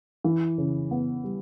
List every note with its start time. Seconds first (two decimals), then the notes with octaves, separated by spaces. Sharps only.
0.24 E3
0.58 C#3
0.91 B3
1.24 G3